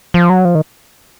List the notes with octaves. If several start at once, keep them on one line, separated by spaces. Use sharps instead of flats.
F3
F#3
F3
D#3